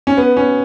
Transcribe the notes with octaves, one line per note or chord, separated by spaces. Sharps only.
C#4
B3
C#4